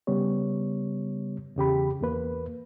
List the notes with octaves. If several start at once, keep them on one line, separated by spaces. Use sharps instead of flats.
C#3 G3 B3 C#5
E2 C#3 G4 B5
E2 A#3 B4